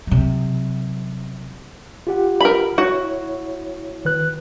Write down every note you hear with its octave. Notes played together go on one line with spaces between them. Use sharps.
C3 F#3
F4 G4 F#5
A#4 B5
E4 F#4 C#5
D#3 B4 F#6